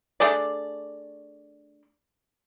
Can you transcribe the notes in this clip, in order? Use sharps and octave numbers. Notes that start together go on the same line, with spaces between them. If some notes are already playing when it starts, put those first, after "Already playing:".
A3 D4 G#4 D5